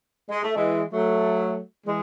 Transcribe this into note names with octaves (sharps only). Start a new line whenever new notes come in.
G#3
A3
E3 G#3
F#3 A3
E3 G#3